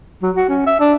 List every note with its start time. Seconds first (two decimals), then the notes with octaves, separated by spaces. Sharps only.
0.22 F#3
0.36 F#4
0.49 C#4
0.66 E5
0.80 D4